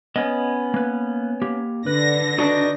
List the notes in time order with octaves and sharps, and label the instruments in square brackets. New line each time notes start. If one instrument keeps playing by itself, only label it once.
[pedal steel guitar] B3 C#4 [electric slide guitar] D#5
[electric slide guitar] A#3 B4
A#3 G4
[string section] D3 A#6 [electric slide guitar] B4
[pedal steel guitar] D4 D#4 [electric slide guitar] F#4 B4